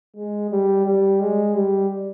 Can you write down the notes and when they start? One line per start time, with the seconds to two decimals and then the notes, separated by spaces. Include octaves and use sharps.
0.15 G#3
0.50 G3
0.86 G3
1.20 G#3
1.55 G3